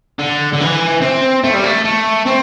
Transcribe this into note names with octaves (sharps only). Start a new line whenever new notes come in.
D3
D3
E3
C4
A3
G3
A3
A3
C4